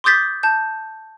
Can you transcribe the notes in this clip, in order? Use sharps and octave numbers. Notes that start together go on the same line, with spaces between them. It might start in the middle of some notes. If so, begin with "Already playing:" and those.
C6 D6 D#6 G6 A6 B6
A5 G6